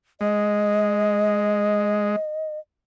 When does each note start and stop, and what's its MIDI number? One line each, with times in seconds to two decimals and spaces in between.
0.21 2.16 56
0.21 2.59 75